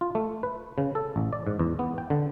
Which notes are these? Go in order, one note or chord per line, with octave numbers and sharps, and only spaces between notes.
F4
A3
B4
C#3
A4
A1
D5
G#2
E2
B3
G5
D3